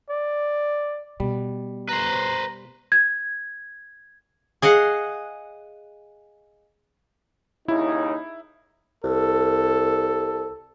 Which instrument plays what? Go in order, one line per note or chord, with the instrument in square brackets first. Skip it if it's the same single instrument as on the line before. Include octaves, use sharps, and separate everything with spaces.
[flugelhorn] D5
[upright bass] B2 [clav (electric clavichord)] G3
[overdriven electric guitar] B4 C5 [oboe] A#5
[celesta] G#6
[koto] G#4 D#5 F5 F#5
[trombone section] D#2 C#3 D#4 [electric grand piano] E4
[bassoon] C2 [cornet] A4